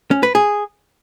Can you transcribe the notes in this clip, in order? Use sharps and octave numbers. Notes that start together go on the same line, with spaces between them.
C#4
B4
G#4